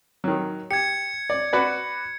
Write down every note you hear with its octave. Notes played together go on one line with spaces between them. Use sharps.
D#3 F#3
G4 G#6 C#7
D5
F#4 B4 D5